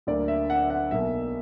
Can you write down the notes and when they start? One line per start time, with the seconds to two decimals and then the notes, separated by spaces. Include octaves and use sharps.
0.07 D2 D3 F#3 A#3 D5
0.28 E5
0.50 F#5
0.62 E5
0.70 F#5
0.91 B1 B2 A#3 E5